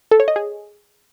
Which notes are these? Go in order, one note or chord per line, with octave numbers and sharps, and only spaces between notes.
A4
C#5
D#5
G#4